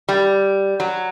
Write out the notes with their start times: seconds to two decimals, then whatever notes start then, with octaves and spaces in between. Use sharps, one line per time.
0.09 G3
0.80 F#3